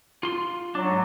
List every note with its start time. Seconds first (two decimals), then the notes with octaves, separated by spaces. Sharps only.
0.23 F4 C6
0.75 F#3 D4
0.90 G#2